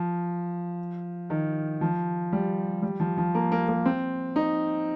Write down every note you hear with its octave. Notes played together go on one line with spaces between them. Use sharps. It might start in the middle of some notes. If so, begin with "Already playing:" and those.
Already playing: F3
D#3
F3
G3
G3
F3
F3
A#3
A#3
A#3
C4
D#4